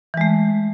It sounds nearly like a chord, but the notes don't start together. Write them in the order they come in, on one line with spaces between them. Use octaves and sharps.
E3 G#3 A3